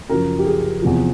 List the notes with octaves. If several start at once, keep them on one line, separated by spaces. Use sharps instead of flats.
F#2 C#3 F3 A#4
G4
G#4
E2 C3 F3